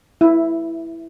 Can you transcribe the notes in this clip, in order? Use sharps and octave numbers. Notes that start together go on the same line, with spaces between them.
E4